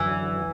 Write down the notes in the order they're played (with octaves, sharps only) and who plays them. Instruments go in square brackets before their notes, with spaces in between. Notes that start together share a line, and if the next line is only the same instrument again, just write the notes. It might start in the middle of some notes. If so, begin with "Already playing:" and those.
Already playing: [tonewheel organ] F#2 D3 F#3 [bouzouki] E3